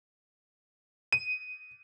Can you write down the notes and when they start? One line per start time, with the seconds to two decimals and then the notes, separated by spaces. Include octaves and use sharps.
1.13 D#7